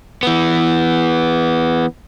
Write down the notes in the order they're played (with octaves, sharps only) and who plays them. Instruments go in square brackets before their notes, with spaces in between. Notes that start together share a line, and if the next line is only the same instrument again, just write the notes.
[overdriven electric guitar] E3 B3